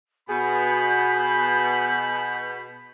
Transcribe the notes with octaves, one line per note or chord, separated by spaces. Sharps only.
B2 G#4 B5 G6